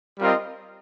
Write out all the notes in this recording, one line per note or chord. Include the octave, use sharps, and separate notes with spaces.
G3 C4 F4 A#4 D#5